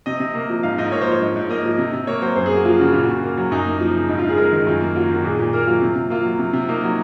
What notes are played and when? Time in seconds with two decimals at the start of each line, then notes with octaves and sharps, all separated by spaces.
0.06 C3 D#5
0.20 C3
0.35 A#3
0.49 F3
0.63 G#2 F5
0.78 G#2 D#5
0.92 A#3 C#5
1.01 C5
1.07 F3 C#5
1.22 G#2
1.36 G#2
1.49 A#3 D#5
1.65 F3
1.79 C3
1.94 C3
2.07 A#3 C#5
2.21 F#3 C5
2.36 F#2 C5
2.46 G#4
2.51 A#3 F#4
2.65 F3 F4
2.80 C#3 F#4
2.92 A#2 F4
3.04 F#4
3.09 A#2
3.23 A#3
3.37 F#3
3.51 F#2 D#4
3.66 A#3
3.78 F3 D#4
3.95 C#3
4.09 G#2
4.18 F4
4.23 G#2
4.29 G#4
4.37 G#3 A#4
4.52 D#3
4.66 F#2 F4
4.81 A#3
4.96 F#3 F4
5.10 D#3 F#4
5.24 A#2 G#4
5.39 A#2
5.53 A#3 A#4
5.67 F#3 F4
5.81 C3
5.96 C3
6.10 A#3 F4
6.25 F#3
6.39 C3
6.53 C3
6.69 A#3 D#4
6.83 F#3